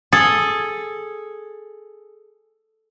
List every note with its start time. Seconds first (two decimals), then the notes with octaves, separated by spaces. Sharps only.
0.13 G#4 A4